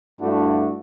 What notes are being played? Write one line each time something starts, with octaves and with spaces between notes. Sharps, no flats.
G2 G3 A3 D4 E4 F#4